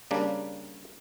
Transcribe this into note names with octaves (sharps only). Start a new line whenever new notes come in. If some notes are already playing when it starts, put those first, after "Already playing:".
C#3 G3 A#3 D4